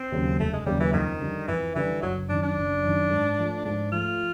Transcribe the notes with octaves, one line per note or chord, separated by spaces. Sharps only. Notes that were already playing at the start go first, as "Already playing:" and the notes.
Already playing: C4
D#2 C#3 F#3 A#3
F1 A3
G#3
D#2 C#3 F#3 G3 A#3
E3
F2 D#3
D3 G3
F2 E3
D3 E3 G3
F#1 F#3
F#2 D#3 D4
D4
F#1
F#2 D#3
G#2
F3 A3
G#2 D4
F3 A3 F4